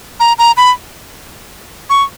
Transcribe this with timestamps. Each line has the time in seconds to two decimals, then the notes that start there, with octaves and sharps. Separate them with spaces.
0.20 A#5
0.39 A#5
0.57 B5
1.90 C#6